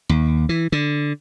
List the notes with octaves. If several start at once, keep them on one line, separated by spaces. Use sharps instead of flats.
D#2
E3
D3